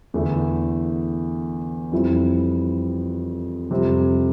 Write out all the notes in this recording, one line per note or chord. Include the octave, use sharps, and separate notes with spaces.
E2 D3 A3 E4
F2 E3 G3 C4 E4
F2 C3 G3 C4